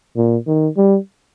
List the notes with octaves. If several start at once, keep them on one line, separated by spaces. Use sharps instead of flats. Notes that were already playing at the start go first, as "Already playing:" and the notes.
A#2
D#3
G3